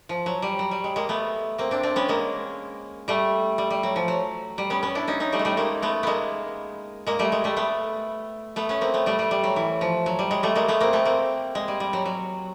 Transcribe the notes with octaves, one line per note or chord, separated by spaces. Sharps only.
F3
F#3
G3
F#3
G3
G#3
G#3 A#3
A3 B3
A#3 C4
C4 D4
C4 D4
B3 C#4
G#3 A#3
G3 A3
G3
G3
F#3
F3
F#3
G3
B3 C#4
B3 C#4
D4 E4
C#4 D#4
C#4 D#4
G3 A3
G#3
G3 A3
G#3 A#3
A3 B3
G#3 A#3 B3
G#3 A#3
G3 A3
G#3
G3 A3
A3 B3
A3 B3
B3 C#4
A#3 C4
A3 B3
G3 A3
G3
G3
F#3
E3
F3
F#3
G3
G#3
G3 A3
G#3 A#3
A3 B3
A#3 C4
A3 B3
A#3 C4
G#3
G3
G3
F#3
F#3